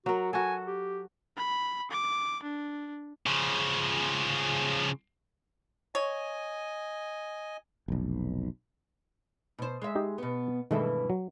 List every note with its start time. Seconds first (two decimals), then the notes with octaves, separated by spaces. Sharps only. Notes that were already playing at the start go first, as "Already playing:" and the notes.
0.06 F#3 F#4 A#4
0.33 F#4 A4 G#5
0.66 G4
1.37 B5
1.91 D6
2.43 D4
3.26 C#3 F3
5.95 C#5 D#5 G#5
7.88 F1 B1
9.59 B2 C5
9.82 G#3 E5
9.95 D#4 G4 D#5
10.18 B2 B3
10.71 G2 B2 D#3 E3 G#3 A3
11.10 F#3